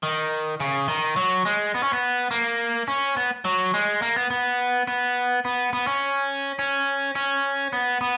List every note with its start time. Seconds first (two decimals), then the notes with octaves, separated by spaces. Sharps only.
0.03 D#3
0.60 C#3
0.88 D#3
1.16 F#3
1.45 G#3
1.74 B3
1.83 C#4
1.93 B3
2.31 A#3
2.88 C#4
3.17 B3
3.45 F#3
3.74 G#3
4.02 A#3
4.16 B3
4.30 B3
4.87 B3
5.45 B3
5.73 B3
5.87 C#4
6.59 C#4
7.15 C#4
7.73 B3
8.01 B3